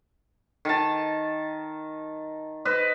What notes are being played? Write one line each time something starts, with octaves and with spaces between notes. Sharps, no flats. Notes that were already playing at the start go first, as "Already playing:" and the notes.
D#3 A5
B4 C5 D#5